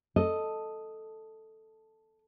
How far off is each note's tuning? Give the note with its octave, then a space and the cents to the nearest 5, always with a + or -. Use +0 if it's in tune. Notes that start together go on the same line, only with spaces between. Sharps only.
A4 +0 D#5 +0